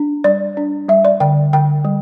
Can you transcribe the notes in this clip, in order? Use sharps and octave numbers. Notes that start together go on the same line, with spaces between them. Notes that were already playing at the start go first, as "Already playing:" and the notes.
Already playing: D4
G3 D5
D4
G3 E5
D5
D3 G5
D3 G5
G3